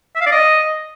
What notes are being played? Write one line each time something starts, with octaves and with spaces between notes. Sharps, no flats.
E5
F5
D5
D#5